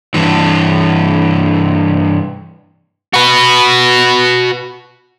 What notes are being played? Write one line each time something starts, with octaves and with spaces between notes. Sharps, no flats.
G2 E3
F#4 B4